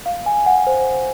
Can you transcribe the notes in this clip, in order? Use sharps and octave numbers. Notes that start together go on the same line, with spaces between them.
F5
G#5
F#5
C5